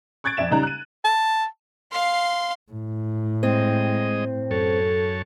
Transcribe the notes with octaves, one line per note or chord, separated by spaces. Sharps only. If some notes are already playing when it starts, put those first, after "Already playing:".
C#6 F#6 G#6 A6 D7
F2 D5 E5 E7
C#3 G3 D#4 A#5 F#6
F#6 D#7
A5
F5 C6
A2
G#3 C4 D#5
F#2 A4 C#5 A5